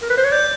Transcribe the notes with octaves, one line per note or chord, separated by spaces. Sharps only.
A#4
B4
C5
C#5
D5 G6